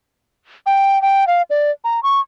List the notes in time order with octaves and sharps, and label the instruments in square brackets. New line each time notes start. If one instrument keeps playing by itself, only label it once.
[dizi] G5
G5
F5
D5
A#5
C#6